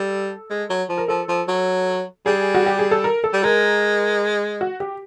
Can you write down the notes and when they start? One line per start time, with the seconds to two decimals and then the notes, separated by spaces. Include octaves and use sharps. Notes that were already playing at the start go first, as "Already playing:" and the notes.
Already playing: G3 A4
0.50 G#3
0.70 F#3
0.89 F3
0.98 A#4
1.08 F3 A4
1.29 F3
1.48 F#3
2.26 G3 G#4
2.55 F#4
2.66 G4
2.79 G#4
2.91 A4
3.04 A#4
3.24 A4
3.33 G3
3.44 G#3 A#4
4.61 F#4
4.80 G4